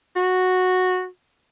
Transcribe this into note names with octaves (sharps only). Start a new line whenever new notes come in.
F#4